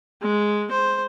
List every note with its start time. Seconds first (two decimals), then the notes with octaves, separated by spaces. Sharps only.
0.22 G#3
0.71 C5